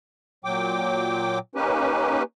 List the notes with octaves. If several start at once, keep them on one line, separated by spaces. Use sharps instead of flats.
A#2 F#3 G5 D6
A#3 C#4 D#4 G4 B4